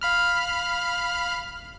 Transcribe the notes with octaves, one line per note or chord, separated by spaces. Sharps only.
F5 B5 F6